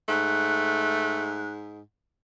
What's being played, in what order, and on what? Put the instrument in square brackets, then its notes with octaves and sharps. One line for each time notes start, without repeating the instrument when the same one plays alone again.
[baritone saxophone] G#2 [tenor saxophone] A3 [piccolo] F#6